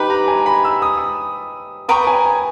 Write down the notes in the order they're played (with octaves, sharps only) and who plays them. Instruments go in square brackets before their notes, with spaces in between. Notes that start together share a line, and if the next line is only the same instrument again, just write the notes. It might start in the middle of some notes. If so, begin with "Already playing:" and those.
Already playing: [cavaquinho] D#4 G4 B4 [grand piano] B5
[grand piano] A#5
G#5
B5
E6
D#6
[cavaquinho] B4 G5 A#5 C#6 [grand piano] D#6
[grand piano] G#5
G#5